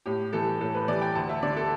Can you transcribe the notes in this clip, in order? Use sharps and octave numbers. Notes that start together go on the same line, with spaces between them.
A2 G4
E3 G3 A4
A2 A4
B4
E3 G3 D5
G5
D2 A5
E5
D3 G3 D5
A4